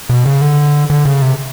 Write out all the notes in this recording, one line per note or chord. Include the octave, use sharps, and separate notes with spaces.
B2
C#3
D3
D3
C#3
C3